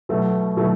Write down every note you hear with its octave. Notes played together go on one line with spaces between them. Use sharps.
B2 F#3 A3
B2 F#3 A3